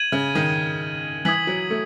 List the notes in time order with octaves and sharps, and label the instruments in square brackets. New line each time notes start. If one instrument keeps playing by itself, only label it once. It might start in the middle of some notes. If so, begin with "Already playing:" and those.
Already playing: [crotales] G#6 D#7 F#7
[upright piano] C#3
D#3
[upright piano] E3 [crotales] D#6 G#6 B6 F#7
[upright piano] F#3
A3